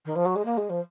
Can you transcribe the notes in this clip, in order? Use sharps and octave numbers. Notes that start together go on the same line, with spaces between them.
D#3
F3
F#3
G#3
A#3
G#3
F3